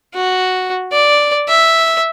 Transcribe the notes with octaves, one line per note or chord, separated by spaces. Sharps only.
F#4
D5
E5